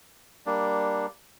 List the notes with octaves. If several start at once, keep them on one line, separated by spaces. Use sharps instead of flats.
G3 A#3 D4